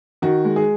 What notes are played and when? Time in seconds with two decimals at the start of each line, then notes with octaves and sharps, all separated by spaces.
0.22 D#3 F#4
0.45 G#3
0.56 G#4